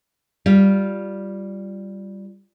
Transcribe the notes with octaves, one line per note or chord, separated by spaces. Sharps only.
G3 F4